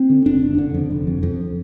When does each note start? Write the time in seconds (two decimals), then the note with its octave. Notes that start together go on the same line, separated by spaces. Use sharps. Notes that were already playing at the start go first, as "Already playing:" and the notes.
Already playing: C4
0.10 D3
0.26 F1 D4
0.42 F1
0.58 D3
0.74 F2
0.90 F1
1.07 F2
1.23 F2